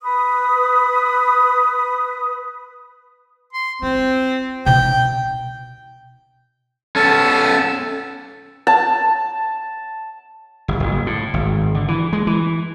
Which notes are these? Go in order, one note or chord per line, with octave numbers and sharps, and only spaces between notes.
B4 D#6
C6
C4 F4
B2 D#4 G5
B3 C#4 A4 A5
A5
G1
F#1
A2
G#1
D3
E3
G#3
E3